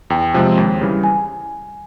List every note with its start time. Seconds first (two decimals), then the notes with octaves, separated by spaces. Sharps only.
0.10 E2 G5
0.34 C3 F3 G#3 C4
0.57 D#2
0.81 C#3 E3 G3
1.03 G#5